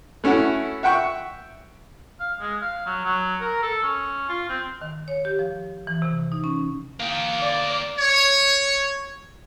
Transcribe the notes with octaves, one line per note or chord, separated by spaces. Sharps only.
A3 C#4 E4 F#4
E5 F#5 G5 C#6
F5
G#3
F5
F#3
F#3
A#4
A4
C#4
F4
C4
D#3
C#5
G4
F3
E3
C3
D#4
C#4
A#3 G5
D5
C#5